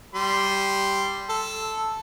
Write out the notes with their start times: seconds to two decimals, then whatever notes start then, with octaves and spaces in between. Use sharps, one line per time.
0.15 G3 C6
1.29 A4